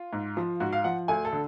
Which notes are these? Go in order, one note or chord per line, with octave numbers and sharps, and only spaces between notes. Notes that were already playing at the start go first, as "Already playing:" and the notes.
Already playing: F4
G#2
F3
G#2 F#4
F5
F3 F#5
D2 G#5
A4
D3